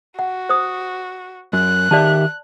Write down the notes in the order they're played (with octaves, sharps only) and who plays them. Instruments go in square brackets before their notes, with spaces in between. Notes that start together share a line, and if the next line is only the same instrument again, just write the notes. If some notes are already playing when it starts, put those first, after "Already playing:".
[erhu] F#4 [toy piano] F#5
[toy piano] C5 D#6
[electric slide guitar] F#2 [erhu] F#6
[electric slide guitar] D#3 G4 E5 [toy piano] D5 A5